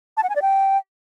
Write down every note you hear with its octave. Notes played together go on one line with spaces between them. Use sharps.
A5
F#5
G#5
D5
G5